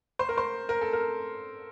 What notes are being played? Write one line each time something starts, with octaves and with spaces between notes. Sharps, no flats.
C5
A#4
C5
A#4
A4
A#4